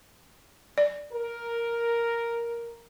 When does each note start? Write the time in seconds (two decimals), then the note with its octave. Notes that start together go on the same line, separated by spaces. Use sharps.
0.78 D5
1.13 A#4